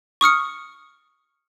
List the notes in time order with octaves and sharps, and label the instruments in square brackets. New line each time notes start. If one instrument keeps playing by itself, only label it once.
[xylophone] C#6 D#6 F6 C#7